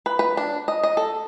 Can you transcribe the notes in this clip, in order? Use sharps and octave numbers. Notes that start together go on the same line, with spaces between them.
B4
B4
D4
D#5
D#5
A4